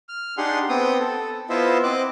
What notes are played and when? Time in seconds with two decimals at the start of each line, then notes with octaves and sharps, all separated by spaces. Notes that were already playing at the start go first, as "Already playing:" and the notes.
0.09 F6
0.38 D4 D#4 G4 G#4 F#5 C6
0.69 B3 C4 G5 D#6
1.00 A4
1.49 B3 E4 F4 C5 D#5 E5
1.83 C4 D#5 D6 F#6